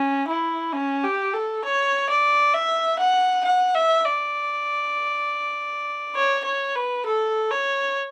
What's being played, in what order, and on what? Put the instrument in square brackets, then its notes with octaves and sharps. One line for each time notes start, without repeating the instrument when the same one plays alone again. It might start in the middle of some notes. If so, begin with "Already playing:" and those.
Already playing: [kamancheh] C#4
E4
C#4
G4
A4
C#5
D5
E5
F#5
F#5
E5
D5
C#5
C#5
B4
A4
C#5